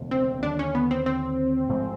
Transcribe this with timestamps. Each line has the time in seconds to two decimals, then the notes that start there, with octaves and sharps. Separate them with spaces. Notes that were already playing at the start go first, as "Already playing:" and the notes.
Already playing: E1 D2 C#3
0.11 C4
0.43 D#2 D3 F#3 D4
0.59 C#4
0.75 B3
0.91 C4
1.06 C4
1.69 A1 G#2 F3 A3